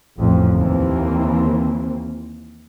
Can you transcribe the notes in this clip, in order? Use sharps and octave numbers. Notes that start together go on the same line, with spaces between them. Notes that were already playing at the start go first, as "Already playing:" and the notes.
A1 F2 A2
D#2 E3 A#3 C4